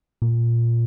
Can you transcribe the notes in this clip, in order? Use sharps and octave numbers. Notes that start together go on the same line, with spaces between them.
A#2